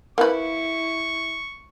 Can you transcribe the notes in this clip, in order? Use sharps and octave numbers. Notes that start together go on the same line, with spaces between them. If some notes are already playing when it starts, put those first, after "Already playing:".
A#3 E4 B4 C#6